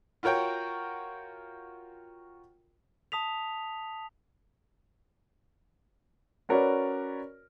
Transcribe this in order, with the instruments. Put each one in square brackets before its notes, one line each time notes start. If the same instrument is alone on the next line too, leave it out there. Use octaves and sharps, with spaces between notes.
[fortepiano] F4 F#4 A#4 C#5 G5
[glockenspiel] A5 D#6 B6 F7
[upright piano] C#4 F#4 A#4 B4 C#5 D5